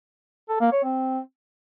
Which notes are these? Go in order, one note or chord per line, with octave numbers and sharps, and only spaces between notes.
A4
A#3
C#5
C4